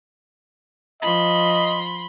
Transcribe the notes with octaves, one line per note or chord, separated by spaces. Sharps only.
F3 D#5 B5 C6